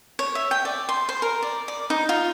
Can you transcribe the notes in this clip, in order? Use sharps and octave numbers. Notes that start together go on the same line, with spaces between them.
C#5
E5
G5
D5
C6
C5
A#4
D5
D5
D#4
F4